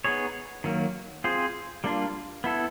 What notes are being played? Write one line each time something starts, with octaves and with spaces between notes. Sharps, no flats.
B3 D#4 G#4 C#5
D#3 F#3 A#3
C4 F4 G#4 C5
G3 A#3 D4 F4
B3 E4 A4